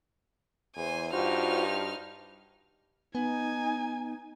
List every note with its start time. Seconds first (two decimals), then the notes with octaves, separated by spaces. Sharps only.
0.76 E2 C5 G#5
1.13 G2 D#4 F4 F#4 C5 F6
3.15 B3 D#4 G#5